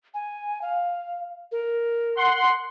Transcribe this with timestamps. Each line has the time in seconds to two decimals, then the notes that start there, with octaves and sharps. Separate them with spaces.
0.14 G#5
0.62 F5
1.52 A#4
2.18 F#5 C6